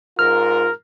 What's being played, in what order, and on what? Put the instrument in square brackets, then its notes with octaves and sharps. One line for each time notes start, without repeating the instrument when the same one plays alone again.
[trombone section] G#2 F4 A#4 [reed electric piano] F6